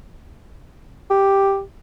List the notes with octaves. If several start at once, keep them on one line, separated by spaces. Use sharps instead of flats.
G4